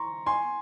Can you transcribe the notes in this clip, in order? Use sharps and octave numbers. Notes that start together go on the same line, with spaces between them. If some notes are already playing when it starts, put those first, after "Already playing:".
Already playing: A#5 C6 C#6
G#5 C6